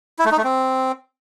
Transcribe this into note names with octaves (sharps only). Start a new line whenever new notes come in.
E4
A3
D#4
A3
C4